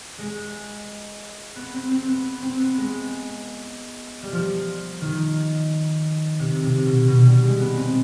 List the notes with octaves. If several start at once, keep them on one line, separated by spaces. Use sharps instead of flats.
G#3
B3
C4
C4
B3
C4
B3
G#3
G3
F3
D#3
C3
C3
B2
B2
G3
G#3
B3
C4